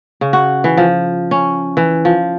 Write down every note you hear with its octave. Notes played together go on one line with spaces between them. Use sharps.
C#3
F#4
E3
F3
C#4
E3
F3